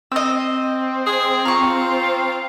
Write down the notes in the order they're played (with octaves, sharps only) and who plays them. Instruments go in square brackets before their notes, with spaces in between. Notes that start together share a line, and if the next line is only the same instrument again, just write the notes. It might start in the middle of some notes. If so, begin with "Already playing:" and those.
[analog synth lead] C4 [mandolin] D#5 E6
[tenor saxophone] G#4
[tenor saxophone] F4 [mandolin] A#5 C#6